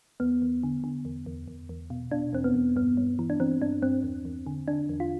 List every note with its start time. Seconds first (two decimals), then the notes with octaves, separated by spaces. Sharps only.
0.20 E2 B3
0.42 E2
0.63 D3
0.84 D3
1.05 E2
1.26 E2
1.48 E2
1.69 E2
1.90 B2
2.11 B2 D4
2.33 E2 C4
2.44 B3
2.54 E2
2.76 G2 B3
2.97 G2
3.19 E3
3.30 D4
3.40 E3 C4
3.61 G2 D4
3.82 G2 C4
4.03 E2
4.25 E2
4.46 D3
4.68 D3 D4
4.89 E2
5.00 F4